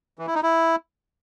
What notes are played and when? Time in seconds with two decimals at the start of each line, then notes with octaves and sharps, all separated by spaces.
0.19 E3
0.27 E4
0.35 D#4
0.43 E4